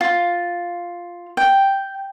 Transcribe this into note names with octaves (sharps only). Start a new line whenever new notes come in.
F4
G5